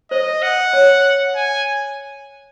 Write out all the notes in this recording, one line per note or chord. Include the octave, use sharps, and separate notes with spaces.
C5 D#5
F#5
C#5
G#5